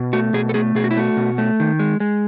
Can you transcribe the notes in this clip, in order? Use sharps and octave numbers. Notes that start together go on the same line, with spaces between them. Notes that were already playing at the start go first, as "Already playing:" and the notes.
Already playing: B2
A3 F#4
B2 G#4
A4
A3 G#4
B2 G#4
F#4
E4
A3 F#4
B2
A3
D#3
G#3
G#3